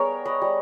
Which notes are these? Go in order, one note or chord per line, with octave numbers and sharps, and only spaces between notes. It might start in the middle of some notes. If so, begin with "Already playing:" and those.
Already playing: G3 B3 G#4 A#4 C#5
B4 D#5
G3